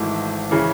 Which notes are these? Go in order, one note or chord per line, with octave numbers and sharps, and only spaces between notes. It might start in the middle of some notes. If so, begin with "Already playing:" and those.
Already playing: G#1 G#2 E3 A3
C#3 E3